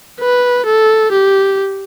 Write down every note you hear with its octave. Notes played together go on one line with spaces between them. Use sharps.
B4
A4
G4